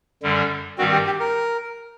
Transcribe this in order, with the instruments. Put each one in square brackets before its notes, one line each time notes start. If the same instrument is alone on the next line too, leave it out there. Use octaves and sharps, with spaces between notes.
[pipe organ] F#2 D3 G3
[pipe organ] G2 D#3 G3 C4 [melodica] F#4
[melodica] G4
G4
A#4